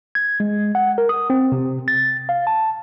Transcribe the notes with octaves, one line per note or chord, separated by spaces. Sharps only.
G#6
G#3
F#5
A#4
D#6
C4
C3
A6
F5
A5